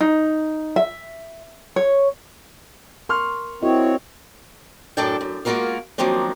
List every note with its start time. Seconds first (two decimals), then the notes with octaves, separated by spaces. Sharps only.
0.01 D#4
0.76 E5
1.76 C#5
3.09 A#4 C6 C#6 F6
3.62 C4 E4 F#4 A#4 C#5 D#5
4.97 F#2 A2 D4 A4 D5 G5
5.21 F#2
5.45 G#3 A#3 F4 F#4 A#4 F5
5.98 D#3 F3 F#3 A#3 C4 D4